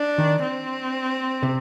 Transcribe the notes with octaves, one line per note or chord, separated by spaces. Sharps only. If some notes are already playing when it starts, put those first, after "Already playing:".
Already playing: D4
D#3
C4
C3